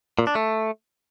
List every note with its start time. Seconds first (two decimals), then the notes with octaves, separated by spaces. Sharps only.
0.19 A#2
0.27 D4
0.35 A3